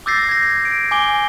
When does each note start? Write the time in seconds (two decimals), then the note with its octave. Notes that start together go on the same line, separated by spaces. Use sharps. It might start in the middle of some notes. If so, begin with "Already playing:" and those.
0.06 D6 E6 G6 A6 A#6 C7
0.29 G#6 A#6
0.65 D7
0.91 G#5 D6 G7